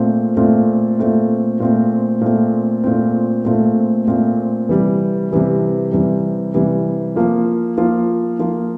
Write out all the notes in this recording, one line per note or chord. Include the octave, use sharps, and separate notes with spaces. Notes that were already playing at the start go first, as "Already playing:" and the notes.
Already playing: A#2 A3 C4
A#2 A3 C4
A#2 A3 C4
A#2 A3 C4
A#2 A3 C4
A#2 A3 C4
A#2 A3 C4
A#2 A3 C4
C3 E3 G3
C3 E3 G3
C3 E3 G3
C3 E3 G3
F3 A#3 F4
F3 A#3 F4
F3 A#3 F4